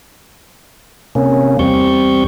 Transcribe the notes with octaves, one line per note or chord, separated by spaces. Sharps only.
C3 A#3 C#4
E2 G3 C4 C#6 G6